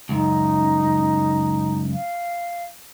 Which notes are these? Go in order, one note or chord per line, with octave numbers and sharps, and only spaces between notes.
C#2 F#2 D#4
F5